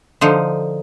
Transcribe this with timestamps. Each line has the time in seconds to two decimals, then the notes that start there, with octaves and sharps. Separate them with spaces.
0.21 D3 F3 D#4